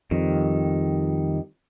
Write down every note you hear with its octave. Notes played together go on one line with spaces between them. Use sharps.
F2 D#3 G3